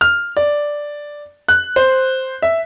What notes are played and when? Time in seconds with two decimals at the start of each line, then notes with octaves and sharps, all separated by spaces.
0.01 F6
0.37 D5
1.48 F#6
1.76 C5
2.42 E5